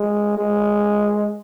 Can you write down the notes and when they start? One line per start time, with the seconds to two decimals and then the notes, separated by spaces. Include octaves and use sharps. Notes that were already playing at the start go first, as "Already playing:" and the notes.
Already playing: G#3
0.38 G#3